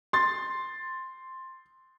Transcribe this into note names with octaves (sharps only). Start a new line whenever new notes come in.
C6 A6